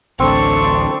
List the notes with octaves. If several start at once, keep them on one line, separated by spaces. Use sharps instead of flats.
A1 D2 C4 D4 A4 C5 C#6